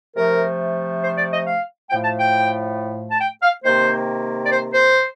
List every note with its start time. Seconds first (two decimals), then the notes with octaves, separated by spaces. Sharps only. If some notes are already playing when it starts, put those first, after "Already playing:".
0.17 C3 F3 A3 A#4
1.03 C5
1.18 D5
1.32 D#5
1.47 F5
1.90 A2 F3 A3 G5
2.04 A5
2.19 G5
3.10 A5
3.20 G5
3.42 F5
3.64 C3 D#3 A#3 C5
4.46 D5
4.51 C5
4.73 C5